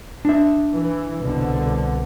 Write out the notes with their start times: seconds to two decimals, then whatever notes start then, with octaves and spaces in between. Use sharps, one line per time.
0.25 D4 E5
0.72 E3
1.19 C2 B2 D3